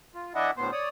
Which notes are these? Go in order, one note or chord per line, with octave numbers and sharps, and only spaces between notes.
F4
E3 D4 E4 D#5 E5 F#5
D2 A2 B3 C5
C#5 D5 D#6